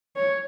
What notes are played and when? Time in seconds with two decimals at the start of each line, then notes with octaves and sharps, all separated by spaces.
0.16 C#5